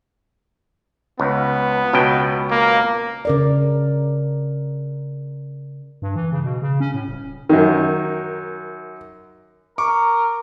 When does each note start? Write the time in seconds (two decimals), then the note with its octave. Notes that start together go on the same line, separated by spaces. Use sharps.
1.20 C#2 B3
1.93 C#2 B2 G5
2.51 A#3
3.25 C#3 A#4 D5
6.02 G2
6.16 E3
6.32 C#3
6.44 B2
6.62 C#3
6.80 C#4
6.94 A2
7.08 D#1
7.49 F#2 D#3
9.78 A#4 C#6 D6